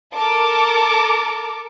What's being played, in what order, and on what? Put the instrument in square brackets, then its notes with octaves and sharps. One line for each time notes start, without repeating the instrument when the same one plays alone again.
[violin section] A4 A#4 A5 D6